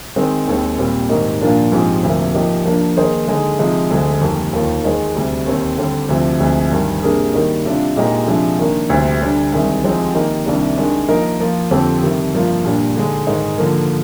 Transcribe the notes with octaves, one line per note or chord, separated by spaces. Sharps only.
D#3 G#3 C4
D#2 D#3 G#3 C4
A#2 G3 C4
G#2 D#3 G3 A#3 D#4
A#2 F3 A#3 D4 F4
G#2 F3 G#3 C4 G4
D2 C3 F3 A#3
F3 A#3 D#4 G4
F3 A#3 D4
D#3 A#3 D#4 G#4 C5
D3 G#3 D#4 G#4
C3 F3 G#3 D#4
D2 D3 G#3
F2 D#3 G3 A#3
D#2 D#3 A#3 F4
D#3 G#3 D#4 G#4 C5
D2 C3 G3
D#2 D#3 G3 C4
D3 G3 C4 G4
D2 C3 F3
D2 C3 F3 G#3
G2 D#3 G3
C3 G3 A#3 D4 G#4
D#3 G3 A#3 D#4
C3 G3 D4 F4
A#2 G#3 D#4 G4 A#4
C3 F3 G#3 D4
D#3 A#3 D4
D2 C3 G3 C4
D3 G3 D4
C2 C3 D#3 G#3
F3 G#3 C4 D#4 G4
D#3 A#3 D#4 G4
C2 C3 D#3 G3 D4
D#3 G#3 D4
F3 A#3 D#4 A#4
F3 A#3 F4
F2 D3 F3 C4 G4
C3 D#3 G3
G2 F3 A#3 F4
A#2 G3 D4
D3 G#3 D#4
G#2 D#3 G#3 D#4
D3 F3 A#3